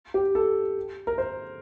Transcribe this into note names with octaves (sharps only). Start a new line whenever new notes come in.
G4
A4
A#4
C5